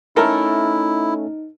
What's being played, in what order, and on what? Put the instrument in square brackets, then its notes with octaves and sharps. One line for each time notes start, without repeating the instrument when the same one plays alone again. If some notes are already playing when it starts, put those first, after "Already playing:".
[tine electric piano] A3 C#4 [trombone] D#4 [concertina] E4 [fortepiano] A4 A#4